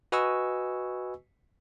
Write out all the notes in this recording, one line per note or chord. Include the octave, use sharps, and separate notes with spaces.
F#4 B4 D#5 G#5 C#6 E6